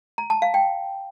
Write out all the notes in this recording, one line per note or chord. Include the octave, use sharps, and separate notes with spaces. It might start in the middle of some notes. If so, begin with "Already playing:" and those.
A#5
A5
F5
G5